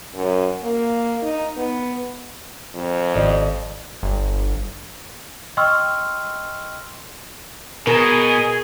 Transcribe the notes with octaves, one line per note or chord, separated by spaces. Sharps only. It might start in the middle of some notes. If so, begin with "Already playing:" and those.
F#2
A#3
D#4
B3
F2
G#1 D5 D#5
G1
D#5 G5 C6 C#6 E6 F6
B2 G#4 A#4